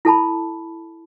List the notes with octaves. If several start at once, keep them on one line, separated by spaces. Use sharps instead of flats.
E4 A4 A5 B5